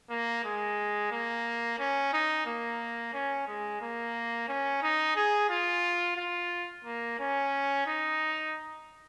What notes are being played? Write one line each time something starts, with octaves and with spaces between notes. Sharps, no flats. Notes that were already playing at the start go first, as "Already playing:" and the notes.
A#3
G#3
A#3
C#4
D#4
A#3
C#4
G#3
A#3
C#4
D#4
G#4
F4
F4
A#3
C#4
D#4